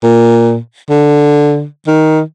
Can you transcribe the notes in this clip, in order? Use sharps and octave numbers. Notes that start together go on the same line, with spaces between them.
A#2
D3
D#3